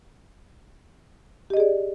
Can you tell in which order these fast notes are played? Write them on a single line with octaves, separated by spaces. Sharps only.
G4 D#5 G#4 D5